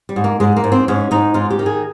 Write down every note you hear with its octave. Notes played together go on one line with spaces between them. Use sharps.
G3
G#2
A#3
G#2 G#3
A#3
G#2
C4
G#2 C#4
G#2 D#4
G#2 F4
G4
D#3
G#4